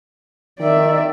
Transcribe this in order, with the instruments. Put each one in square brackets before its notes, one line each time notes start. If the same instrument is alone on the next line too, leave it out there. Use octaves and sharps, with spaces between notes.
[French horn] D#3 [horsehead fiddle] D5 E5